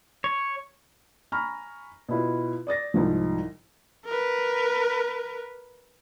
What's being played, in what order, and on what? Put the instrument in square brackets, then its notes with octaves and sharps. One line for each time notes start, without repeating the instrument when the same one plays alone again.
[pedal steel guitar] C#5
[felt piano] G#5 A#5 B5 C#6 F6
B2 E4 F4
D5 D#6 A6 A#6
C2 G#2 F3
[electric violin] A#4 B4